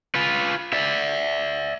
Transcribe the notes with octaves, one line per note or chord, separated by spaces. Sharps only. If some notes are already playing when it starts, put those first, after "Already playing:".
F4 B4
D5 E5